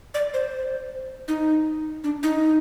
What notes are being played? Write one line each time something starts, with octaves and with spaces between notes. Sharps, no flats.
D5
C5
D#4
D4
D#4